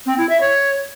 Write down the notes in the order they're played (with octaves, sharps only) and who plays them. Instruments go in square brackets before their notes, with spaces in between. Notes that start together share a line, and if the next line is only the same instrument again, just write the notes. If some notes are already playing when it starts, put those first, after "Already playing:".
[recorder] C4
E4
E5
C#5